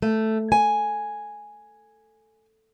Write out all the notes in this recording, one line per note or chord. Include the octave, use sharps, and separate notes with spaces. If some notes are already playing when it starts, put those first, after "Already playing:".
A3
G#5